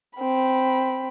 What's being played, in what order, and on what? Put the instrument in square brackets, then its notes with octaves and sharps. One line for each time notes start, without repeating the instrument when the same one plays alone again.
[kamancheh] C4 B5